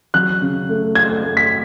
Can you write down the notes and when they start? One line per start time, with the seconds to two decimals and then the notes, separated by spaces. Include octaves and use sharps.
0.14 F#3 F#6
0.42 C#3
0.69 A3
0.95 A3 G#6
1.23 A3
1.37 B6